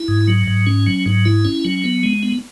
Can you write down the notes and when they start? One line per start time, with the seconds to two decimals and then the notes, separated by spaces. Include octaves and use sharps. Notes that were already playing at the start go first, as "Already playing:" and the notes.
Already playing: E4
0.08 G#2
0.28 F#3
0.47 G#2
0.67 C#4
0.87 F#3
1.06 G#2
1.25 E4
1.45 C#4
1.65 F#3
1.84 B3
2.03 G#3
2.23 B3